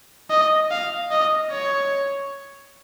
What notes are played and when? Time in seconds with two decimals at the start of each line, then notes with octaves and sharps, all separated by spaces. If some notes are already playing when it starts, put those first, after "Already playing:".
0.30 D#5
0.71 F5
1.11 D#5
1.52 C#5